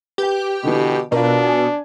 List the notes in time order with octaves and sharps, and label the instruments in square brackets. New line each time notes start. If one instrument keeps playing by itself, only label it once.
[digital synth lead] G4 [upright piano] B4 G5
[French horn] B2 [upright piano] D3 E3
[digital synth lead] B2 [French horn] D4 [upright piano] F4 A#4
[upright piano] G#5